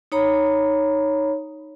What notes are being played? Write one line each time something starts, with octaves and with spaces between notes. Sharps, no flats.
D#4 C#5 A#5 B5